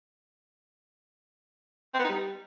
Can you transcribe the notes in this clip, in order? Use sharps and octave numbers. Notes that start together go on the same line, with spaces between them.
C4
B3
D#4
G3